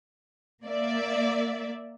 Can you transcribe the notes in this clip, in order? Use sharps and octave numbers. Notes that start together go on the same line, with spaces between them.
A#3 D5 E5